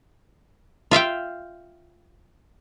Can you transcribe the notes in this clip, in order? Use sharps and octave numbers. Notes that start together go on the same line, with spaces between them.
F4 E5 F5 G5